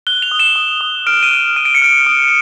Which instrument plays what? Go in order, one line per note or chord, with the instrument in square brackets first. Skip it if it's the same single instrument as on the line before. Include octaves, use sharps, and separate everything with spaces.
[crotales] F#6 G7
F7
D#6
E7
D#6
D#6
F6 D7
D#7
F6
F6 D#7
D7
C#7
F6 D7
D#6